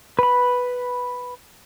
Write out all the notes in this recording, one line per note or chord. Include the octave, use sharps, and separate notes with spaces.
B4 B5